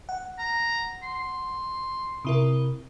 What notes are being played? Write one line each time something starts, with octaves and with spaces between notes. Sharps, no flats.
F#5
A#5
C6
C3 E4 A#4